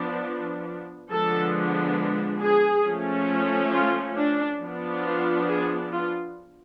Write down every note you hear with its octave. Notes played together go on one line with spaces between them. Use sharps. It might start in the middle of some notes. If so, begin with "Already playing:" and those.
Already playing: F3 B3 D4
D3 F3 G#3 B3 D4 A4
G#4
F3 A3 C#4
F4
D4
F3 B3 D4
F4
G#4
F4